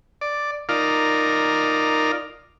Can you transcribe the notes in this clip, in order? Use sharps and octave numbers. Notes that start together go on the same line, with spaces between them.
D5
D#4 F4 A#4 D5 F5